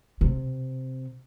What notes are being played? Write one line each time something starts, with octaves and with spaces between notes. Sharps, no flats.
C3